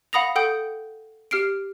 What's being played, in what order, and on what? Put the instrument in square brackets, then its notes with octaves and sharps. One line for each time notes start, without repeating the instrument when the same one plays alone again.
[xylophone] F5 F#5 B5 D#6 A#6 F7
A4 F#5 G5 D#6 G6 D7
G4 F6 C7 D7